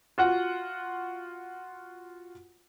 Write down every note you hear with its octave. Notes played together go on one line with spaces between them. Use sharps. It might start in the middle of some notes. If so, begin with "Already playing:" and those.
F4 F#4 F#5